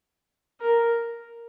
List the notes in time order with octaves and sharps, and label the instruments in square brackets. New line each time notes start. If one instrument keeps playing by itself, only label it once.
[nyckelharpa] A#4